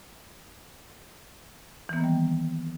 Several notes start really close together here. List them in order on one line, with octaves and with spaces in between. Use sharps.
E3 B3 A#3 D#3 G3